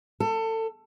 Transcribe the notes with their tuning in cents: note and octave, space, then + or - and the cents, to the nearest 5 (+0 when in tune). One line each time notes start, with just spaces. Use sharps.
A4 +25